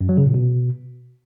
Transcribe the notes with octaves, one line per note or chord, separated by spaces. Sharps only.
F#2
F#3
C#3
A#2
B2